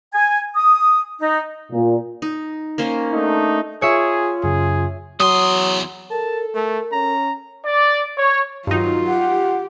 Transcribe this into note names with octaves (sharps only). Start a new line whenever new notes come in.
G#5
D#6
D#4
A#2
D#4
A#3 C#4 C5
A3 D4 D#4
F4 G#4 C#5 E5
F#2 C#3 G#4
E2 F#3 C6 D#6
A4 A#4 A5
A3 A#4
C#4 A#5
D5
C#5
G2 D#3 F#3 D#4 F4 F#4
G4 F#5